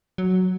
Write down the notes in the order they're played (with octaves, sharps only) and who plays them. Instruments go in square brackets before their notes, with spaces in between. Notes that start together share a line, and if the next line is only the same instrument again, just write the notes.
[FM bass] F#3